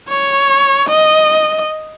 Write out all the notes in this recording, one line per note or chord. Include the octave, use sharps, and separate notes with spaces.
C#5
D#5